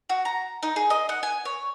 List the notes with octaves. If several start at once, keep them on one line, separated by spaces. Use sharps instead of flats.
F#4
A#5
D#4
G#4
D#5
F#5
G#5
C#5